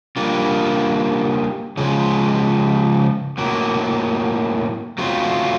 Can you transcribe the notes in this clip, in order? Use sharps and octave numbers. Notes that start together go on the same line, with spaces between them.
G3 A#3 D4 F4
C#3 F3 G#3
A2 F#3 A#3
F#3 A3 C4 F4